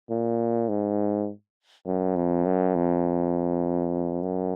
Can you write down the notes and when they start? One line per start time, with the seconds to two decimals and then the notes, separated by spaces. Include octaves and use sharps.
0.10 A#2
0.69 G#2
1.86 F#2
2.16 F2
2.45 F#2
2.75 F2
4.23 F#2